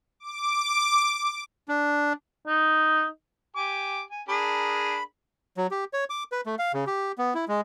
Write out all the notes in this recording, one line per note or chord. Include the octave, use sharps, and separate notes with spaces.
D6
D4
D#4
G4 G#5 D6
G#5
D4 G#4 A#4 B5
F#3
G4
C#5
D6
B4
A3
F5
C#3
G4
B3
E4
G#3